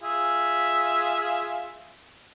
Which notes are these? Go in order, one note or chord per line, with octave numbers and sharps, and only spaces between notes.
F4 G#4 E5